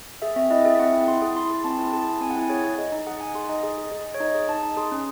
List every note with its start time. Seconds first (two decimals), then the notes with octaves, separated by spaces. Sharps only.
0.22 G#4 E5
0.36 C4 E5
0.51 E4 D#5
0.65 G#4 E5
0.75 E5
0.79 C4 F#5
0.93 E4
1.07 E4 C6
1.22 G#4
1.36 E4 C6
1.50 G#4
1.64 C4 A5
1.79 E4
1.85 C6
1.93 G#4 A5
2.07 E4
2.21 C4 G#5
2.30 F#5
2.36 E4 G#5
2.49 G#4 C#5
2.64 G#4
2.78 G#4 D#5
2.92 D#4
3.07 G#4 F#5
3.21 D#4 G#5
3.35 G#4 C6
3.49 D#4 D#5
3.63 G#4
3.78 G#4
3.92 G#4
4.06 G#4
4.15 C#5
4.20 D#4 D#5
4.35 G#4
4.49 D#4 A5
4.63 D#4
4.77 G#4 C6
4.92 C#4